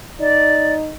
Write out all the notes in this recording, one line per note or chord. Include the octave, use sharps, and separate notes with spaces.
D#4 D5